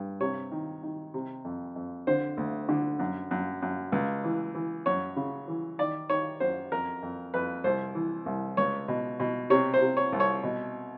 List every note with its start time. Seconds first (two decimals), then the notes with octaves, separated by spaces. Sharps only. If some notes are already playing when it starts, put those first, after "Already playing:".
Already playing: G2
0.20 C3 C#5
0.52 D#3
0.83 D#3
1.14 C3
1.45 F2
1.76 F2
2.07 D3 C5
2.37 D2
2.69 D3
2.99 F#2
3.31 F#2
3.62 F#2
3.92 C#2
4.24 E3
4.55 E3
4.86 F#2 C#5
5.16 C#3
5.48 E3
5.79 D#3 D5
6.10 D#3 C#5
6.40 F#2 C5
6.72 F2 A#4
7.03 F2
7.34 F2 B4
7.64 C2 C5
7.95 E3
8.26 C2
8.57 C#2 C#5
8.88 B2
9.20 B2
9.50 C3 C#5
9.74 C5
9.81 C3
9.97 C#5
10.12 C2
10.20 C#5
10.43 B2